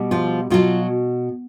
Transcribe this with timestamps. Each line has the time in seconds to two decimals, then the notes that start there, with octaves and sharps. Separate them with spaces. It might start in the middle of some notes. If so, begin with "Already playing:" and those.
Already playing: B2 G3
0.11 F3 F4
0.50 B2 F3 F#3 F4